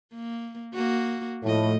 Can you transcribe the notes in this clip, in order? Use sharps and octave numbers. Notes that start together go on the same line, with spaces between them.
A#3
A#3 F#4
A2 F3 D#5